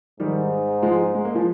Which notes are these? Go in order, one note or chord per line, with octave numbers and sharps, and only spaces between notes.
G#2 D#3 G3
F3 G#3
G#3
A#3
F3 G#3